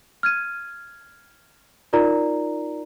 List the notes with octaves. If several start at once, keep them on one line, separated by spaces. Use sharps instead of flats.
F6 G#6 D#7
D#4 F4 A#4 D5 A#5